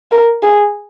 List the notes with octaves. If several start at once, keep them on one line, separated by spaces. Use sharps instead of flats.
A#4
G#4